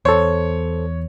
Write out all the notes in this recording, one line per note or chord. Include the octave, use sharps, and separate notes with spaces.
E2 A4 C5 C#5